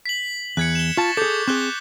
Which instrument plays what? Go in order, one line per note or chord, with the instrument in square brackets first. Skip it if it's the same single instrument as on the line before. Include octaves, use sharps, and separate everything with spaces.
[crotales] B6 F#7
[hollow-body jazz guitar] E2 [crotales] F#6 G#6 C#7
[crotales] E7 G7
[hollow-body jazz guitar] F4 A5 [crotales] C#6 A6
[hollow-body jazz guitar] G#4 A4 [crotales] D6 G6 C#7
[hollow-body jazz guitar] C4 G#4 [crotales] C#6 F#6 G7